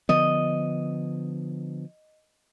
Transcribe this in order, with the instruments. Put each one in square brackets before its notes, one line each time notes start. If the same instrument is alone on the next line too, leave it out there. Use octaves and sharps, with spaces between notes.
[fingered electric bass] D3 F3 B3 [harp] D#5